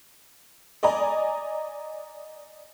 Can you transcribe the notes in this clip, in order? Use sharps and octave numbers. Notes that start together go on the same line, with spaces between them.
D5 D#5 G#5 A#5